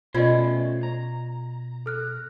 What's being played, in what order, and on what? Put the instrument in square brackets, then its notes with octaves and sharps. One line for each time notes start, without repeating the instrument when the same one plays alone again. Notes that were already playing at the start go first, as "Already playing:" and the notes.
[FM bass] B2 [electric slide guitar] A3 C#4 C5 [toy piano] F4 D5 D#5 [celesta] G#6
[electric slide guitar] A#5
[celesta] A4 F6 F#6